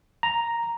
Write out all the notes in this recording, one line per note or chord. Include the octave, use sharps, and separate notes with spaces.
A#5